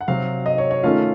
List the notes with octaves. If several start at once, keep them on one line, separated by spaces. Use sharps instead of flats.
F#5
C3 F#3 C4 F5
D#5
C#5
C#5
D#3 A3 C#4 F4 F5